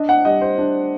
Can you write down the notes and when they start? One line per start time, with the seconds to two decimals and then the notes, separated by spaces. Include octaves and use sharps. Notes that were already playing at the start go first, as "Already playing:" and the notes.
Already playing: D4 D#5
0.09 F#5
0.25 G3 D#5
0.41 C5
0.58 D4